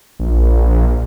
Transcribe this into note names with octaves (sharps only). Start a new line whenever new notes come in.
A#1